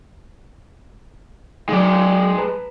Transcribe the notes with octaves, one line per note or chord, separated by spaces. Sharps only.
F#3 G#3 D#4 D5
B4 A5 A#5